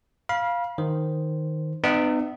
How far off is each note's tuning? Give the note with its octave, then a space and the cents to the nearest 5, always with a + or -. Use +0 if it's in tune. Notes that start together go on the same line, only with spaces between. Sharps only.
F5 +0 B5 -35
D#3 +0 C5 +0
B3 +30 D#4 -40 E5 +20